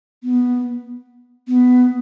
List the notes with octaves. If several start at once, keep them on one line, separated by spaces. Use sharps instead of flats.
B3
B3